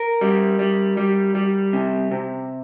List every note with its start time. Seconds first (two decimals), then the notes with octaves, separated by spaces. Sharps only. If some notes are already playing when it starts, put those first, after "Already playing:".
Already playing: A#4
0.21 G3
0.59 G3
0.97 G3
1.35 G3
1.73 C3
2.11 C3